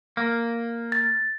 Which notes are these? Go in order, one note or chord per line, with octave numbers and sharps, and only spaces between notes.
A#3
A6